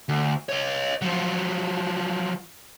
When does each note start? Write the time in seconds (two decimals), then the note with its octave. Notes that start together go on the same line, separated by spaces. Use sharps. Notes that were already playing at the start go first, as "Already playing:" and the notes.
0.09 D2
0.49 C#5 D#5
1.02 F3 F#3